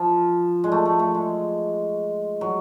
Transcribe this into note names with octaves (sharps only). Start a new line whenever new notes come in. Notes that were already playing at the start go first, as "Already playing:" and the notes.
Already playing: F3
G#3
A3
A3
A3
G#3
F#3